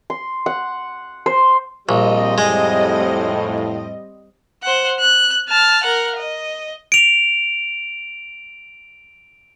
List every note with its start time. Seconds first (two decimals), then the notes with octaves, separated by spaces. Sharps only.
0.10 C6
0.46 F#5
1.26 C5
1.89 A#1 G3 C4 D#5
2.38 F2 A2 G#3
4.63 C5 F#5
4.99 F#6
5.49 A5 F6
5.83 A#4 F#5
6.17 D#5
6.92 D7 F7